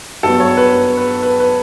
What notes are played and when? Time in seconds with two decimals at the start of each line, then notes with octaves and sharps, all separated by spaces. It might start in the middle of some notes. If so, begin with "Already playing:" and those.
0.23 G2 F#3 B3 A4
0.40 C#5
0.57 B4
0.73 B4
0.97 B4
1.22 B4
1.40 B4